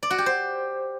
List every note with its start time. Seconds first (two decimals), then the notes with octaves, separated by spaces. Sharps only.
0.03 D5
0.10 F#4
0.18 G4
0.26 C5